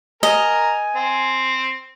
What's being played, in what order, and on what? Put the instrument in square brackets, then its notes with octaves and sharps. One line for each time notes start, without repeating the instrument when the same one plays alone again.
[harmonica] A#4 [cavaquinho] D#5 [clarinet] G#5
[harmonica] C4